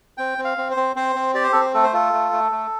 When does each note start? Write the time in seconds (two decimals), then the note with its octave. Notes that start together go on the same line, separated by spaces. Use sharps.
0.18 C4 G5
0.38 C4
0.45 F5
0.58 C4
0.71 C5
0.77 C4
0.96 C4 C5
1.16 C4
1.34 G4 D5
1.43 C5
1.52 C4 A4
1.61 C5
1.74 A3 A4
1.83 C5
1.93 F4 A4
2.13 A3
2.32 A3
2.52 A3